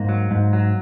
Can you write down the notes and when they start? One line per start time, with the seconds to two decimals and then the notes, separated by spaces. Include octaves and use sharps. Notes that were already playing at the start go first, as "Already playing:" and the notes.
Already playing: G#2 A#3
0.09 F#3
0.31 G#2
0.53 F#3